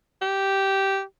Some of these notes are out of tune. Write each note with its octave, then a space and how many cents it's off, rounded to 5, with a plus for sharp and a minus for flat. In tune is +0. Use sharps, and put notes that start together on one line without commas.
G4 -10